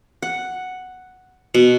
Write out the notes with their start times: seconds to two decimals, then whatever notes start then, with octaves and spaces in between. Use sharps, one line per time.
0.22 F#5
1.54 B2